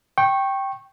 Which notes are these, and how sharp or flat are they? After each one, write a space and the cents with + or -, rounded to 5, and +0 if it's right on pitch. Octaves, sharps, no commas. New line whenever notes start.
G5 -5 C#6 -20